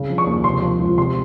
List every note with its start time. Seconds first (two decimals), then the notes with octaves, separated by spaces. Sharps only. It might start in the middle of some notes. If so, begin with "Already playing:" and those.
Already playing: C2 C#3
0.10 F3
0.18 C#6
0.27 D#2
0.44 C3 C6
0.62 F3
0.80 C#2
0.98 C3 C6